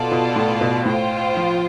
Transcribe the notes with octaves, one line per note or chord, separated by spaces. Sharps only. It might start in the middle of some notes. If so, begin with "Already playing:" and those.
Already playing: B2 B3 F4 A4 D5 A5
B2
A2
B2
A2 F4 C5 G5
F3